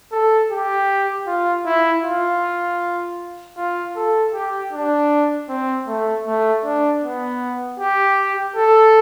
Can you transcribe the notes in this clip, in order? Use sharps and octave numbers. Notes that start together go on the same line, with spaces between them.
A4
G4
F4
E4
F4
F4
A4
G4
D4
C4
A3
A3
D4
B3
G4
A4